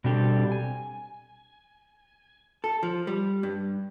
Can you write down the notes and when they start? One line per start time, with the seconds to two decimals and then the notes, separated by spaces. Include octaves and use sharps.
0.04 B2 G3 C4 D4 G4 A4
0.52 G#5
2.64 A4
2.83 F3
3.07 G3
3.43 G2